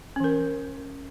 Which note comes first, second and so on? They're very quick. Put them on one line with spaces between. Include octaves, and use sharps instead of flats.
C#4 E3 A#4